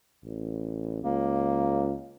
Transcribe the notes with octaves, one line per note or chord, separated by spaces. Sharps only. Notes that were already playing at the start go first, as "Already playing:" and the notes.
A1
C#2 A#3